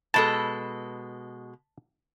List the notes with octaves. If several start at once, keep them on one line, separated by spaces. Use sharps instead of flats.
B2 G#3 A4 A5